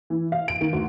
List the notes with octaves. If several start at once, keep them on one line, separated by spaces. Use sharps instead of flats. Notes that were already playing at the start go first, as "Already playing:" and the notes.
E3
F5
D7
D#3
D2